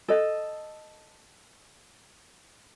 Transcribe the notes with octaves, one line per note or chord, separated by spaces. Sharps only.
A4 D#5